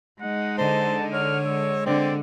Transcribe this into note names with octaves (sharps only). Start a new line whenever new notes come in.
G#3 D#4 F#5
D3 C5 A5
C#5 F6
G#3 E6
D3 C4 D5